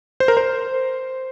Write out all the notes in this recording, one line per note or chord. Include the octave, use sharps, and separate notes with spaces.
C5
A#4
C5